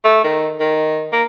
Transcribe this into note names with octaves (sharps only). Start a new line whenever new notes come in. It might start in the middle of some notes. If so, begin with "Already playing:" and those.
A3
D#3
D#3
A#3